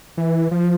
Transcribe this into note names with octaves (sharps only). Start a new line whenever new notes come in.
E3
F3